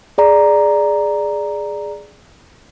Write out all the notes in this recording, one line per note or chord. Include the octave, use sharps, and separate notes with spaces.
G#4 D5 A#5